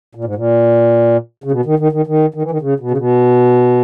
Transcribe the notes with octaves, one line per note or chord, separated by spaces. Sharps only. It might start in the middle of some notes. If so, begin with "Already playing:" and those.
A#2
G#2
A#2
C#3
B2
D#3
D#3
D#3
D#3
D#3
E3
D#3
C#3
B2
C#3
B2